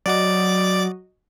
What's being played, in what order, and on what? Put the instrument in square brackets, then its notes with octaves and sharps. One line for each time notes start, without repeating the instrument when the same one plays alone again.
[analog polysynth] F#3 F#4 D#5 [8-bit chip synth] D5 D6